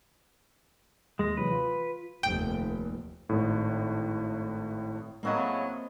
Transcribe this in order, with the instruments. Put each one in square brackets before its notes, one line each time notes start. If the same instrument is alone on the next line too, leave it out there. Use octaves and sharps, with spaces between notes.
[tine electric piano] D#2 A#6 [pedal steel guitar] G#3
[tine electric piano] C3 E3 F#3 [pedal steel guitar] B4
[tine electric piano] F4
[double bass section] F1 D#2 [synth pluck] G5
[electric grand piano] G#1 A2
[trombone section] A2 C#3 F#3 [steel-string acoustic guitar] A#3 C4 D#5